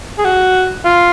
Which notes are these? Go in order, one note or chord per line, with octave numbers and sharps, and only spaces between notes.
G#4
F#4
F4